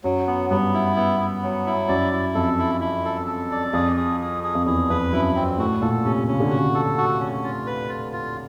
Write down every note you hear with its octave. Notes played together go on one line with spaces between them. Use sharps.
F#2 F#3
B3
G2 B3
E4
B3
B3
F#3
E4
F#2 D5
E4
F2 A4
E4
E4
A4
A4
D5
F2 G#4
G#4
G#4
G#4
F2
E2 G#4
F2 B4
F#2 E4
C4
A2 F#4
A#2 A4
C3 C#4
C#3 C#4
D3
C#3 F#4
A4
F#4
C#4
F4
B4
F4
F4